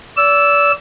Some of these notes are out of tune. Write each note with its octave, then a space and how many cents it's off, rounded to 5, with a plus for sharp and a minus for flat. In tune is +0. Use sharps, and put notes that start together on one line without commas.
D5 -30 E6 +0